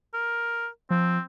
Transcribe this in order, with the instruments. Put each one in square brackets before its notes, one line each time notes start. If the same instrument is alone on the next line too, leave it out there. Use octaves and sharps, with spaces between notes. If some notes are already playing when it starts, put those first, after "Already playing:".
[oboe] A#4
[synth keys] F3 [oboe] C4